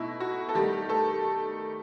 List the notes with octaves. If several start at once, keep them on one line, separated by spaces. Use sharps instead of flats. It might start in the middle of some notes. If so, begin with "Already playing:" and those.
Already playing: B2 A3 D#4 E4
F#4
A4
D#3 G3 A3 D#4 G4
A3 A4